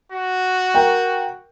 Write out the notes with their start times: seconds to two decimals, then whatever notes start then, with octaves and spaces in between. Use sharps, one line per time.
0.12 F#4
0.74 A#4 G5